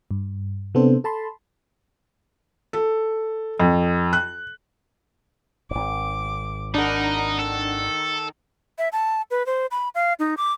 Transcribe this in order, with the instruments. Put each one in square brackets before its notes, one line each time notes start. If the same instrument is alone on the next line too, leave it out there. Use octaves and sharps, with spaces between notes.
[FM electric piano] G2
C3 B3 C4 D4 A4 C5
A4 A5 B5 C6
[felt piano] A4
F2
F#6
[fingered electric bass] D#1 G#1 [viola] D6
[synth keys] D4 F#5 [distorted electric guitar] D#4 [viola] A#4 B5
[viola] D#3 [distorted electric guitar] A4
[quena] E5
A5
B4
C5
B5
F5
D#4
D6